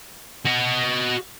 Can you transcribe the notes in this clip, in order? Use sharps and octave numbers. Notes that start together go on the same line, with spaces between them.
F#4 D#5